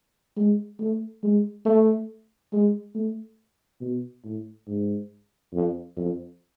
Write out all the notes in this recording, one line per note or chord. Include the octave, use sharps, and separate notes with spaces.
G#3
A3
G#3
A3
G#3
A3
B2
A2
G#2
F2
F2